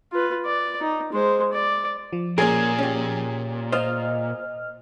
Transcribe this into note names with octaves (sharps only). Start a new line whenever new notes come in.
F4 B4
D5
D#4
G#3 C5
D5
F3
A#2 A#3 C#4 G#4 A#4
C#4 G4
F4 C5 D#5 F6